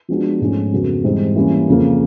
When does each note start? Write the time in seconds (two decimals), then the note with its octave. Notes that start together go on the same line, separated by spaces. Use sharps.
0.09 F3 G#3 B3 D4 F#4
0.40 G#2 F3 A3 C#4
0.72 F2 C#3 F#3 B3
1.04 G#2 E3 G3 C4 D#4
1.36 E3 G3 A#3 C#4
1.68 F2 C#3 F3 A#3